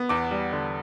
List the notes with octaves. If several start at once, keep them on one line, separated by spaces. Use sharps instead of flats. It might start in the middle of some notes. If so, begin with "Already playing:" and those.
Already playing: B3
E2 D6
G3
D3